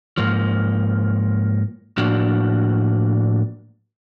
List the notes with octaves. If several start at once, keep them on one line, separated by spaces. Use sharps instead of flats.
G#2 F3 A#3
A2 F3 A#3 D4 F#4